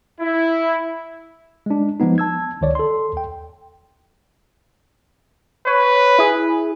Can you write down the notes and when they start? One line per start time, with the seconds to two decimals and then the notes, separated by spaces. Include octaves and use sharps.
0.21 E4
1.66 G#3 D4
2.00 F3 G#3 B3 D#4
2.18 A5 E6 G#6
2.61 C#2 D#3 C#5 D5
2.75 A4 C6
3.13 D#2 G5
5.67 B4 C#5
6.19 E4 G#4